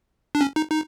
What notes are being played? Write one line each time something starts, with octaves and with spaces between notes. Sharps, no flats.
D4
C#4
D#4
D#4